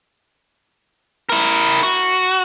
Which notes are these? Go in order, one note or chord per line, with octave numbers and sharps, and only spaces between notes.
E4 A#4
F#4